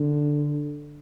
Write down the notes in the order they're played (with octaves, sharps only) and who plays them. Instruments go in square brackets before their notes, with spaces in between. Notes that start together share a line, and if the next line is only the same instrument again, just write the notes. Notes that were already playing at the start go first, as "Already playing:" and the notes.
Already playing: [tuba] D3